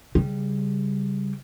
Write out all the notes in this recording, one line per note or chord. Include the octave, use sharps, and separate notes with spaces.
C#3 G3